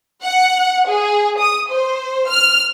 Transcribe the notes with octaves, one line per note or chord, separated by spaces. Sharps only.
F#5
G#4
D#6
C5
F6